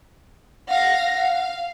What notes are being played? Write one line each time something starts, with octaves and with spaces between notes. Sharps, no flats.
F5 F#5 A#6
F5